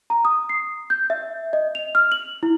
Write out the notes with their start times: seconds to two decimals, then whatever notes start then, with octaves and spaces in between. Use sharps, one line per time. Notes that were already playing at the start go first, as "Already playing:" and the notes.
0.10 A#5
0.25 D#6
0.49 C7
0.90 G6
1.10 E5
1.53 D#5
1.75 F7
1.95 F6
2.12 F#7
2.43 E4